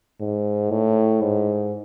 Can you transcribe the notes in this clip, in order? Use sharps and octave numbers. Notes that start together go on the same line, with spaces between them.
G#2
A2
G#2